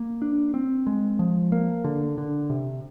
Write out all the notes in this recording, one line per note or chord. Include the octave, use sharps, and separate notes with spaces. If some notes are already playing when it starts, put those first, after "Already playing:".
Already playing: A#3
D4
C4
G#3
F3
A#3
D3
D3
C3